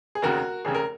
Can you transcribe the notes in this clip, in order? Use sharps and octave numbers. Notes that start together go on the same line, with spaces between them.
G#4
F1 D#2 C#3 F#4 A#4
F1 D#2 C#3 G#4
A#4